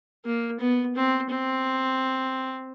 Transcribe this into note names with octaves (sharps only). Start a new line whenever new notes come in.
A#3
B3
C4
C4